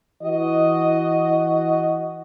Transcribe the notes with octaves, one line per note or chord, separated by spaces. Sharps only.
E3 F#4 D#5